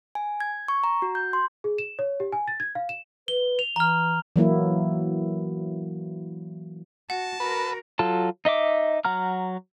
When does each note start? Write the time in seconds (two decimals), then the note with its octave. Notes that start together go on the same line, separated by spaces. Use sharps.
0.15 G#5
0.40 G#6
0.68 C#6
0.84 A#5
1.02 F#4
1.15 G6
1.33 C6
1.64 G#4
1.78 E7
1.99 C#5
2.20 G4
2.32 G#5
2.48 A6
2.60 G#6
2.75 F5
2.89 E7
3.28 B4 G7
3.59 F7
3.76 E3 A#5 F6
4.36 E3 F#3 A#3 E4
7.10 F#4 F#5 A5
7.40 F#4 A#4 B4
7.99 F#3 F4 A4 A5
8.45 D#4 D#5 E5 D6
9.05 F#3 F#5 A#5 F6